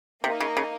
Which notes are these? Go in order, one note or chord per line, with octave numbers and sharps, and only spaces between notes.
C3 A#3 D#4 A#4 D#5
C#3
C#3